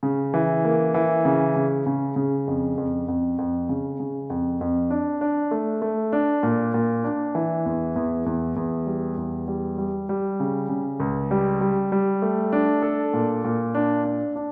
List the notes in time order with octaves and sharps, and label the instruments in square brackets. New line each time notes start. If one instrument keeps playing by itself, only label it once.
[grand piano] C#3
E3
A#3
E3
C#3
C#3
C#3
C#3
F2
F2
F2
F2
C#3
C#3
F2
F2
D4
D4
A3
A3
D4
A#2
A#2
D4
E3
E2
E2
E2
E2
G3
E2
G3
G3
G3
C#3
C#3
C#2
G3
G3
G3
A3
D4
A4
A#2
A#2
D4
D4
D4